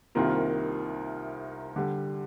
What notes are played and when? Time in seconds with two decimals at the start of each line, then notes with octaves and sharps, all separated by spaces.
0.15 C2 C3 D#3 A#3 F4
1.76 D3 G3